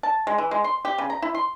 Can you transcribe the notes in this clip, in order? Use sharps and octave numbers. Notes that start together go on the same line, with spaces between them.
A5
G#3
E3
G#3
C6
G4
C#3
A#5
E4
C6